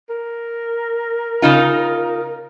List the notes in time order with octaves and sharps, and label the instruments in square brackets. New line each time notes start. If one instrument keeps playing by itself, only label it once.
[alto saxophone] A#4
[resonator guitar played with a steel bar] C#3 D#4 F4